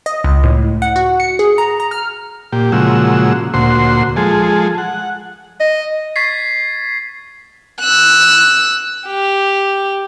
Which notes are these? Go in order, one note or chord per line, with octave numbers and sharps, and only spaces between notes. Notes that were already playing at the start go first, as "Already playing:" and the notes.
D#5
C#2
A2
F#5
F#4
C#7
G#4
A#5
A#5
F6
A#2 G4
A#2 C#3 F3 G#3 F#4 E6
D2 A#2 F#4 C5 C6
F3 G#3 G#4 A4
F#5
D#5
C#6 G#6 A6 B6 C7
E6 F#6
G4